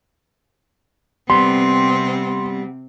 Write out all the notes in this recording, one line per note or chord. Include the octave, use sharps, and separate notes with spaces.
C3 G3 B3 C4 C6